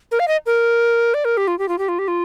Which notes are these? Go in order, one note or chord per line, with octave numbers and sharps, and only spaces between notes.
A#4
F5
D#5
A#4
D5
A#4
G4
F4
G4
F4
G4
F4
G4
F4